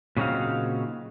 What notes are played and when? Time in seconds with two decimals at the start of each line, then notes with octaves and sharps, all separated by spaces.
0.17 A#2 C#3 F#3 C4 D#4 F5